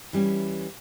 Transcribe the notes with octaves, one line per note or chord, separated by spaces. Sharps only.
E3 G3 C#4